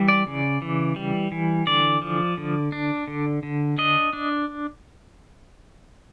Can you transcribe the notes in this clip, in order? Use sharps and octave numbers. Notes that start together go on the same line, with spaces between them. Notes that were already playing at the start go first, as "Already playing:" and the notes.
Already playing: E3 G3
D5
C#3
E3
G3
E3
D3 D5
F3
D3
D4
D3
D3
D4 D#5
D4